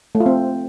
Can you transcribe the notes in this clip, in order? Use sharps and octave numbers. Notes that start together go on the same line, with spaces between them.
A3
F4
C4